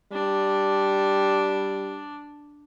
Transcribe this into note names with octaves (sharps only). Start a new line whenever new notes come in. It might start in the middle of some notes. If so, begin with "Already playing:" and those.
G3 D4